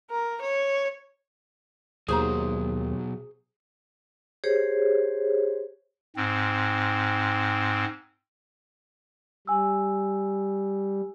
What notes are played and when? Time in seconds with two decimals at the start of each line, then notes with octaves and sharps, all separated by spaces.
0.10 A#4
0.41 C#5
2.08 D#2 B2 F#3 G#4 C5 A#5
4.44 G4 G#4 C5 C#5
6.16 G#2 C4
9.47 G3 G#5 E6